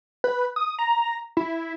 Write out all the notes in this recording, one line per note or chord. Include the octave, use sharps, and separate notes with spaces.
B4
D#6
A#5
E4